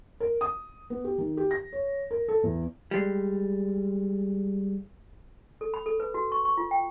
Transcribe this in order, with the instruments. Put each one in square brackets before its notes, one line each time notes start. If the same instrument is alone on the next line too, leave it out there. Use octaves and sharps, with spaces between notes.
[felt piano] A#4
D#6
B3
G4
D#3
G4
A#6
C#5
A#4
A4
E2
[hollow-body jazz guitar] G3 G#3
[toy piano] A4
B5
A4
B4
F#4
C#6
C#6
F4
G5